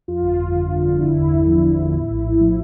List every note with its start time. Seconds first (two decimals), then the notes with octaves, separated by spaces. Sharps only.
0.08 F2 F4
0.22 G1
0.39 G1
0.54 D3
0.70 F2
0.86 G1
1.01 D3 E4
1.17 E2
1.33 E2
1.47 F3
1.63 D3
1.79 E2
1.94 A2
2.10 A#1
2.25 A#1
2.40 F3